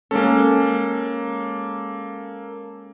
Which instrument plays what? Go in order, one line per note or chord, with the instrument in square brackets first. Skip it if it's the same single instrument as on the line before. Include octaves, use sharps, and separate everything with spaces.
[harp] G#3 C#4 [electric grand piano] A#3 A4